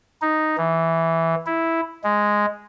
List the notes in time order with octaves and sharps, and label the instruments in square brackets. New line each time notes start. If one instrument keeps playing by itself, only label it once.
[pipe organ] D#4
E3
E4
G#3